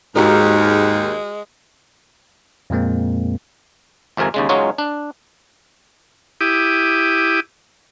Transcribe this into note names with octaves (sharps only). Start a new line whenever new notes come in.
D#2 G#2 G#3 F#4 G4 A#4
F2 A#2 G#3 A#3 C4
G#1 F2 C3 A#4 G#5
D#2 C#3 G#3
F#3 G#3 C#4 D#4 F4 C#5
D4
E4 G4 D6 D#6